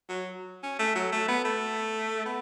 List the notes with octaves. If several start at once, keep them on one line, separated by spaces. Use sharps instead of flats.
F#3
C#4
A3
F#3
A3
B3
A3
B3